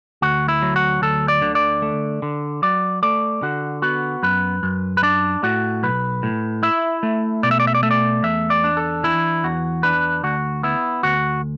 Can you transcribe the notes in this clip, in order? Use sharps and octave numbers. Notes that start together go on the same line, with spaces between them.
D2 F#4
E4
F#3
F#4
D2 A4
D5
D3
D5
A3
D3
F#3 D5
A3 D5
D3 F#4
B3 F#4
F#2 B4
F#2
B4
D4 D5
A2 F#4
B1 B4
A2
E4 E5
A3
B2 D5
E5
D5
E5
D5
A3 E5
D5
E2 E5
D5
D4
A4
E3 E4
E2 F#4
D4 B4
D2 F#4
B3 E4
D2 F#4